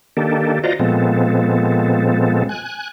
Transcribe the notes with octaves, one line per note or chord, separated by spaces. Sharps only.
D#3 A#3 D4 G4 A4
F4 F#4 C5 D5 D#5 A#5
A#2 F3 G#3 B3 C4 A4
G#5 F#6